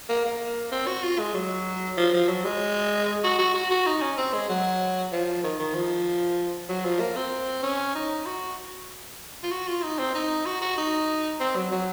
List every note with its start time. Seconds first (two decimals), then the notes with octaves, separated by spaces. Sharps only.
0.09 A#3
0.25 A#3
0.72 C4
0.87 F#4
1.03 F4
1.19 G#3
1.34 F#3
1.97 F3
2.13 F3
2.29 F#3
2.45 G#3
3.24 F#4
3.39 F#4
3.54 F#4
3.71 F#4
3.86 D#4
4.02 C#4
4.17 C4
4.33 G#3
4.49 F#3
5.12 F3
5.43 D#3
5.59 D#3
5.74 F3
6.69 F#3
6.85 F3
7.00 A#3
7.16 C4
7.63 C#4
7.95 D#4
8.26 F#4
9.43 F4
9.51 F#4
9.68 F4
9.83 D#4
9.99 C4
10.15 D#4
10.46 F#4
10.62 F#4
10.78 D#4
11.40 C4
11.56 F#3
11.72 F#3